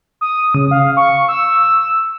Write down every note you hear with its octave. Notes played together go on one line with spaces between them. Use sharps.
D#6
C#3
F5
C#6
E6